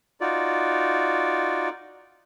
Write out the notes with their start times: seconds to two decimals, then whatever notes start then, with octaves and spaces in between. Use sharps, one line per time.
0.21 D#4 F4 F#4 D5